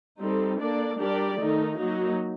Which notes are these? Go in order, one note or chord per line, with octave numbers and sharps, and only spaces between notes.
G3 C4 D#4 A4
A#3 D4 A4 D5
G3 D4 G4 A#4 D5
D#3 A3 D#4 A4
F#3 A#3 D#4 F#4